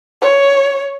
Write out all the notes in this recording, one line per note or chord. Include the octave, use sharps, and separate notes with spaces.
C#5